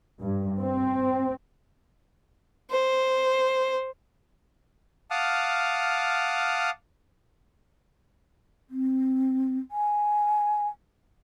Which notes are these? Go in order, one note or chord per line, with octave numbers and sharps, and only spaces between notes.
G2
C4
C5
F5 F#5 A5 D6 D#6 F6
C4
G#5